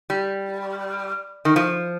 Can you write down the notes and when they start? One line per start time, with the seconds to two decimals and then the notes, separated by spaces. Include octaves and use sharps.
0.10 G3
1.45 D#3
1.56 F3